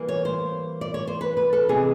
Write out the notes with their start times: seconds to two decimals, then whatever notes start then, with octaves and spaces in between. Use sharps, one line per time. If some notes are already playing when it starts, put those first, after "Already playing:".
Already playing: E3 G3 A#3
0.09 C#5
0.25 C5
0.81 D5
0.94 C#5
1.07 C5
1.21 B4
1.37 B4
1.53 A4
1.69 C3 E3 G#3 C4 G#4